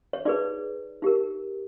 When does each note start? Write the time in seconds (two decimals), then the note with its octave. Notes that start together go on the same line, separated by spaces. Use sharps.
0.13 C#5
0.25 D#4 G#4 B4 D5
1.02 D#4 G4 A#4